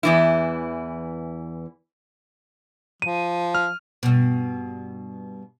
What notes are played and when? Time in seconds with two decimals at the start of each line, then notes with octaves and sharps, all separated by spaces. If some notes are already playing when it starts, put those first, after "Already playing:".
0.03 E2 E3 E4
3.02 F3 D#7
3.55 F6
4.03 G2 B2